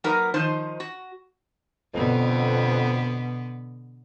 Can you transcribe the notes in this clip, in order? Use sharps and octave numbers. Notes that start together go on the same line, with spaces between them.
F#3 A#3 D#4 F#4 A#4 B4
D#3 F3 D#4 C5
F#4
F2 B2 D3 B3